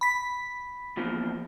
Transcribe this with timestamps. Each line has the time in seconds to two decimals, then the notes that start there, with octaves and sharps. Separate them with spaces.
0.01 B5 B6
0.97 E2 A#2 F3